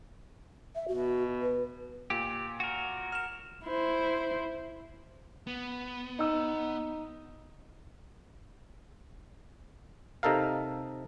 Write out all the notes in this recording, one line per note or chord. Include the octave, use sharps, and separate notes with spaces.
E5
B2 F#4
B4
A#2 G4
F#4 A#4
F6 E7
E4 C5
B3
D#4 E6
C3 D#4 A4 A#4 F5